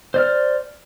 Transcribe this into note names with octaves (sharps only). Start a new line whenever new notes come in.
C5 D5 F6